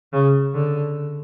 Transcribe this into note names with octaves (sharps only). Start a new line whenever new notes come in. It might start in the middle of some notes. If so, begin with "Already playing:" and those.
C#3
D3